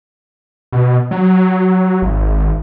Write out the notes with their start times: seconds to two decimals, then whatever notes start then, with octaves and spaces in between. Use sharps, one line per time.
0.72 B2
1.11 F#3
2.02 G#1